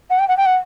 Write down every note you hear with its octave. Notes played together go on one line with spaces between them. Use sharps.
F#5
G5
F#5
G5
F#5